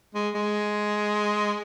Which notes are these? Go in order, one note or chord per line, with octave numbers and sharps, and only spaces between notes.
G#3
G#3